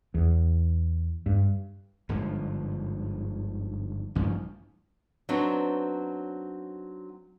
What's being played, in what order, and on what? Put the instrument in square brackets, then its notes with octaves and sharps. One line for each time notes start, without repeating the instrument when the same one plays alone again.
[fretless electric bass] E2
G2
[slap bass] G1 G#2 D3 F3
A1 G2 F3
[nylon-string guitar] F#3 B3 C4 D4 D#4 C#5